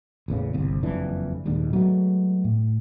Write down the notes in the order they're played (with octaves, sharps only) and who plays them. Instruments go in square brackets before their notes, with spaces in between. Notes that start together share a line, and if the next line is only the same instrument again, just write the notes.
[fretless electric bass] A1 E2 C#3
G1 C2
F#1 F2 E3 D4
D#1 D#2 G#2 D4
F#3 G#3 A3 B3
A2